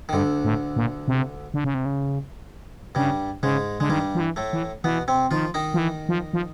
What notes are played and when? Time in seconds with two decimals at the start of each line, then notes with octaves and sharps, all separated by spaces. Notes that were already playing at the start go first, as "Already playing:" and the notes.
0.09 D#3
0.13 D2 G2 D3
0.45 A2
0.76 A#2
1.08 C3
1.54 D3
1.64 C#3
1.74 C3
1.85 C#3
2.95 G2 C#3 G3
3.43 G#2 C#3 G#3
3.80 D3 G#3
3.89 G2 D#3 G3
4.15 F3
4.20 E3
4.36 A2 A3
4.53 E3
4.84 B2 E3 B3
5.08 C3 C4
5.31 D#3 F3 F4
5.54 D#3 D#4
5.74 F3
5.78 E3
6.09 F3
6.33 F3